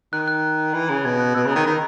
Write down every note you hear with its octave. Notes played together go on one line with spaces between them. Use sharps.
D#3 F#6
F#6
E3
C#3
B2 G#6
F#6
B2 E6
C#3
D#3 A#5
D#3 B5